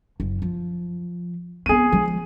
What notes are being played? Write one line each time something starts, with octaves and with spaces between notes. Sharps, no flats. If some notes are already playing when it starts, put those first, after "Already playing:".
F#1
F3
B3 C4 G#4 D#7
F3 G#3